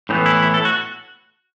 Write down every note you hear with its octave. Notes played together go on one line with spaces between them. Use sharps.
A2 E3 B3 D#4
E4
E4
A4
F#4